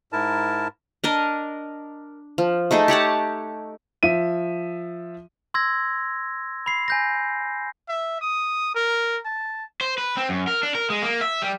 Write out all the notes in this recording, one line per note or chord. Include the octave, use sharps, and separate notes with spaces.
G#2 E4 A#4 A5
D4 A#4 D#5
F3
A3 D#4 G#4 A4
G4 C#5 F#5 A5
F3 E5 D#7
C6 E6 G#6 A#6
B5 C7
G#5 G6 A#6
E5
D#6
A#4
A5
C5
B4
C4
F#2
A#4
D4
A#4
G#3
A#3
E5
G3